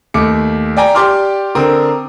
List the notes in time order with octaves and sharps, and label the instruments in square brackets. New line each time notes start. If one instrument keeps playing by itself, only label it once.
[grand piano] D#2 A3 D6 C#7
D5 G5 G#5 A#5
G4 D5 C6 D6 F6
D3 C4 A#4 D#6